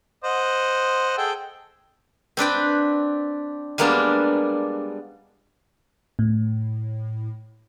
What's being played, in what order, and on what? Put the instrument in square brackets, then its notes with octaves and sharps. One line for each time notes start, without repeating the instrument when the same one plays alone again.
[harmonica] C5 D#5 F#5
G#4 A4 G5
[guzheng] C4 D4 B4 G5
G3 G#3 A#3 B3 D4
[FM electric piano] A2